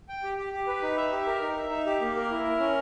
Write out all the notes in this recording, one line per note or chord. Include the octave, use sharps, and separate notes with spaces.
G5
G4
G4
G4
B4
D#4
E5
G4
A#4
D#4
E5
D#4
G4
A#3
A#4
E4
A#4
C#4